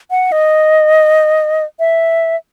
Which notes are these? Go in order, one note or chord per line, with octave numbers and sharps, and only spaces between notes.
F#5
D#5
E5